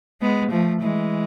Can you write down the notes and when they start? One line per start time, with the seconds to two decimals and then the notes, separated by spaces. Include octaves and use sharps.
0.22 G#3 B3
0.51 F3 A3
0.82 E3 G#3